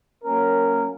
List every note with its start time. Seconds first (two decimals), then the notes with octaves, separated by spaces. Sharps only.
0.23 F#3 A#3 C#4 A#4